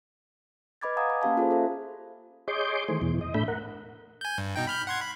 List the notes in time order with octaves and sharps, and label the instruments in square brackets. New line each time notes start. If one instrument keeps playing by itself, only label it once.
[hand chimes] B4 D#5 B5 D6 G#6 A6
F5 F#5 G#5 A#5 D#6 G#6
B5
A#3 C#4 G4 F5 A5
F4 G#4 A4 C5
A4 C5 E5
[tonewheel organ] G#4 C#5 D#5 C6 D6 G6
D#3 E3 A3 G#4 C5
E2 B2 E3
D#5
A2 A3 D4 E5 B5 G6
A#4 F#5
[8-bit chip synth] G#5 G6
G2
B2 D#4 G5
B5 F6 G6
F#5 C6 G#6
B5